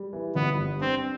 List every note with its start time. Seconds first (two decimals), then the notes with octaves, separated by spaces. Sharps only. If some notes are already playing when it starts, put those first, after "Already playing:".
Already playing: G3
0.13 E3
0.35 G1 B3
0.58 G2
0.81 C4 D4